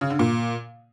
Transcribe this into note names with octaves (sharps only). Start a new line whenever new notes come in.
C#3
D3
A#2